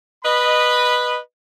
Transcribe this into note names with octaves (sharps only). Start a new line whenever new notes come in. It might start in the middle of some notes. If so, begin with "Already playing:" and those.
B4 D#5 B5